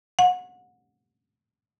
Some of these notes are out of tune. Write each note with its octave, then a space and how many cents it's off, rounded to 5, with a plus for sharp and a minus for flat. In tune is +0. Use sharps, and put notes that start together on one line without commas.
F#5 -30